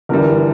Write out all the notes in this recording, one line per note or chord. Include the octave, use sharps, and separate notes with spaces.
G1 G2 E3 G3 A#4